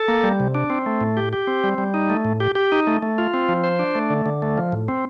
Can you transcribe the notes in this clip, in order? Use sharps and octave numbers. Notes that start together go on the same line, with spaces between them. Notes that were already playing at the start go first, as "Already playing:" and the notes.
Already playing: A4
A#3
G3
C3
D4
C4
A3
A2
G4
G4
C4
G3
G3
D#4
A3
A2
G4
G4
D#4
A3
A3
F4
C4
F3
C5
D4
A3
D3
D3
A3
F3
A2
C4